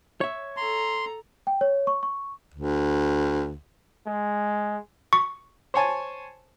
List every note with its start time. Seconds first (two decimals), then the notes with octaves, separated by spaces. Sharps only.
0.21 C#5 E5
0.57 A4 A#5 C6
1.47 G5
1.61 C#5
1.87 C#6
2.03 C#6
2.54 D2
4.07 G#3
5.13 C#6
5.74 C5 C#5 G#5 A5